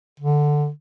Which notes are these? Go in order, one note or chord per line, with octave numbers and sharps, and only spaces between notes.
D3